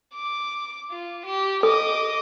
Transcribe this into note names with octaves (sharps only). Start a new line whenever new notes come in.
D6
F4
G4
A4 D#5 D6